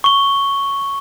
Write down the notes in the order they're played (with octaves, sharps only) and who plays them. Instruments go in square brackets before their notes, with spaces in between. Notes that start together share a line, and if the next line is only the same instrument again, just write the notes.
[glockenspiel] C#6 G7